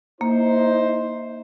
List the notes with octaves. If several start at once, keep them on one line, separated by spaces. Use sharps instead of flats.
A#3 D#4 E4 C5